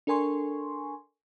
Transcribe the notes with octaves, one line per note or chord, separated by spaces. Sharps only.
D4 A4 A#4 G#5 C6 C#6